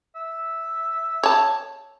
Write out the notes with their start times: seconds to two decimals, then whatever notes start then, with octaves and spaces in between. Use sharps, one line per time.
0.16 E5
1.23 C#5 A5